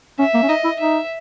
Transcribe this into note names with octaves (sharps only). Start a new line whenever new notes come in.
C#4 E5
A#3
C#4
D#4 D#5
E4
D#4 E5